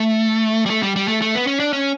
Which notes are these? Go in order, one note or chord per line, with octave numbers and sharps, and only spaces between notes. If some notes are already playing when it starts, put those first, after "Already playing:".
Already playing: A3
G3
A3
G3
G3
A3
A3
B3
C#4
D4
C#4